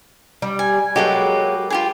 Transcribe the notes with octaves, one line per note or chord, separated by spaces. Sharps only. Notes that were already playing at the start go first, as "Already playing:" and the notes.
G3
G#5
F#3 G#3 A#3 G4 A4 B4
F4 G4 G#4